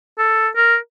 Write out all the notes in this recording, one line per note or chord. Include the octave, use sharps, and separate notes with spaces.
A4
A#4